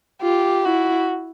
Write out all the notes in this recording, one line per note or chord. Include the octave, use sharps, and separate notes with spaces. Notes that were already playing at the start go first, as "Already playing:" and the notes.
F4 G4
E4 F#4